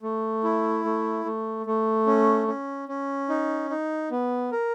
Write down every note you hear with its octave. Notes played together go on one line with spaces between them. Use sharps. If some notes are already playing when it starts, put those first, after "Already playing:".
A3
E4
A3
A3
A3
C#4
C#4
C#4
D#4
D#4
B3
A#4